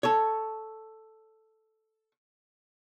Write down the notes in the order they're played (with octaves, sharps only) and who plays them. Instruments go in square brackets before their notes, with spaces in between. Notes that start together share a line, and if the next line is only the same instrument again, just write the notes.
[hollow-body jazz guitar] A4 C#5